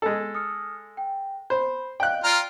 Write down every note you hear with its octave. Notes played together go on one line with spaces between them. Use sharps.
G#3 A4
D#6 F6 C#7
G5
C5 B5
D5 D#5 F5 G5 F#6
F4 D5 A#5 F6 D7